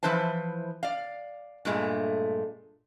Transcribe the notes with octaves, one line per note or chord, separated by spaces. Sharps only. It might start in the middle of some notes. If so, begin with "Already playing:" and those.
E3 F3 E4 B4 C5 A5
D5 F5
G2 A#2 G#3 A3